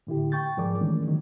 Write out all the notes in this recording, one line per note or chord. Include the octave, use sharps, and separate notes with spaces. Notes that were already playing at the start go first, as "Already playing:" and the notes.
A2 D3 E4 G4
G5 C#6 G6 A6
G#2 F3 G#4 A#4 D5 D6
D#3 E3 G#3 A3 C#4 D4
D#3 F#3